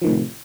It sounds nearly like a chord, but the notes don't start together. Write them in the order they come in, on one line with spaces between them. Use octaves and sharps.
F3 D#3 A2 C3